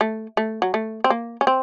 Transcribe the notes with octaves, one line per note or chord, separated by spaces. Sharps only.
A3
A3
F#3
A3
C4
A#3
C#4
C4